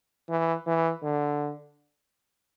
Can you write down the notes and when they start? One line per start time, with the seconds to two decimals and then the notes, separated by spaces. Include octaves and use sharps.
0.29 E3
0.67 E3
1.02 D3